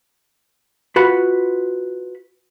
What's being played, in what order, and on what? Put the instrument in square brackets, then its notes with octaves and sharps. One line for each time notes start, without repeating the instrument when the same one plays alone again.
[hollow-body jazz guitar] F4 F#4 B4 B5